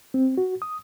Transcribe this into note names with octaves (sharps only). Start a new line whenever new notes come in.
C4
F#4
D#6